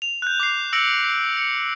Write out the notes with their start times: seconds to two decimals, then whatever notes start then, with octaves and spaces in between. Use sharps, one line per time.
0.02 F7
0.22 F#6 G6
0.40 D6 C7
0.73 E6 A#6 C#7 D7 F#7
1.04 C7
1.37 C#7